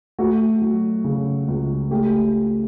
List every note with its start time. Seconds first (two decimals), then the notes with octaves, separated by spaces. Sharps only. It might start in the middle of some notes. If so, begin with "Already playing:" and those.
0.19 A3 F#4
0.62 F#3
1.04 C#3
1.48 C#2
1.91 A3 G4